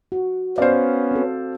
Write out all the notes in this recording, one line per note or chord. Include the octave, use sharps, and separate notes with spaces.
F#4
B3 C#4 C5 D5 F5
C4 F#4 A4